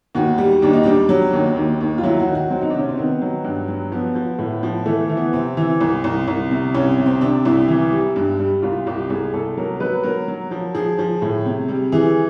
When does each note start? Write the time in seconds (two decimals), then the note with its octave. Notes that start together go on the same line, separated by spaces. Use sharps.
0.15 D#2 F#4
0.38 G3
0.62 D#2 D4
0.73 D#4
0.83 G3 D4
1.09 F#3
1.33 D#2
1.56 D#2
1.81 D#2
1.98 F4
2.03 F#3 E4
2.20 F#4
2.27 D#3
2.35 F#4
2.50 F#3 C4
2.61 D#4
2.70 D4
2.74 C3 C#4
2.89 C4
2.98 D#3 B3
3.22 F#3
3.44 G2
3.68 F#3
3.92 F3 B3
4.15 F3
4.39 A2
4.63 F3
4.86 E3 A3
5.09 E3
5.17 B3
5.33 C3 C4
5.57 E3
5.81 C2
6.04 C2
6.27 C2
6.51 C3
6.75 C2 C#4
6.98 C3
7.06 C4
7.21 C3 D4
7.45 C2 E4
7.68 E3
7.92 G3
8.16 G2
8.39 G3
8.62 C2 F4
8.86 C2 G4
9.10 C2 G#4
9.33 C2 A4
9.57 F#3 A#4
9.80 F#3 B4
10.03 F#3 A#4
10.28 F#3
10.51 F3
10.75 F3 G#4
10.99 F3
11.22 A2
11.46 C3
11.68 G3
11.92 E3 G#4